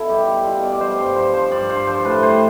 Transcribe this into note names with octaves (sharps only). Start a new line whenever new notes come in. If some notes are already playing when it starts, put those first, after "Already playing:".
Already playing: B2 E4 A4
G3 G4
G3 G4
B2 F4
B2 D5
G3 C5
G2 C5
F3 C5
F3 C5
G2 D5
G2 C5
F3 C5
A2 B4
G3 C5